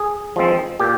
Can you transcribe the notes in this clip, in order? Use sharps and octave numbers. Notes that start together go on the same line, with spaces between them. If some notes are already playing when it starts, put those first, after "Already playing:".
Already playing: G#4
F3 G#3 C4
A#2 G4